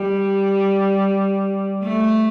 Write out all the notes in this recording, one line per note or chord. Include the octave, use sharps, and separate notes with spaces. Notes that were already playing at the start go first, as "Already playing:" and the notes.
Already playing: G3
A3